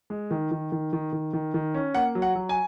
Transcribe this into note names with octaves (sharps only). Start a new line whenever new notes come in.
G#3
D#3
D#3
D#3
D#3
D#3
D#3
D#3
C#4
A#3 F#5
F#3
F#5
F#3
G#5